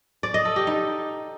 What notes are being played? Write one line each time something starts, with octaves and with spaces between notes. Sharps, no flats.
D5
D#5
A4
G4
D#4